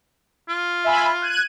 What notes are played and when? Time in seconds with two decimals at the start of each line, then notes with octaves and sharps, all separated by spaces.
0.49 F4
0.84 E5 G#5 B5
1.22 F#6 G#6 D#7